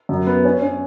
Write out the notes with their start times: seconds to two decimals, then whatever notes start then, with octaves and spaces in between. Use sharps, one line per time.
0.09 F#2
0.27 B3
0.45 C#4
0.62 C#4